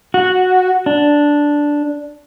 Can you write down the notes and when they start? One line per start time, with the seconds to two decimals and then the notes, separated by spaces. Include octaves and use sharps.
0.14 F#4
0.86 D4